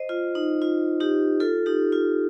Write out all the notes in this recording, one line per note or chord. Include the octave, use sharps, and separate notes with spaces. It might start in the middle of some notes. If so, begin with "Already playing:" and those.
Already playing: C5 D#5
F4
D#4
F4
D#4 G4
F4 A4
D#4 G4
F4